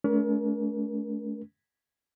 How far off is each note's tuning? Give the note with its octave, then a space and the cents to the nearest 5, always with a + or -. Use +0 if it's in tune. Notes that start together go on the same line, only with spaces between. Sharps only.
A3 -30 C#4 +45 A#4 +35